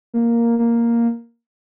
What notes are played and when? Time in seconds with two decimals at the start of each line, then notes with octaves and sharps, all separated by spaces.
0.14 A#3
0.59 A#3